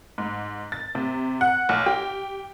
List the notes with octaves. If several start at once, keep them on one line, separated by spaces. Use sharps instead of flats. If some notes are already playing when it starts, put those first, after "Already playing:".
G#2
A6
C3
F#5
B1
G4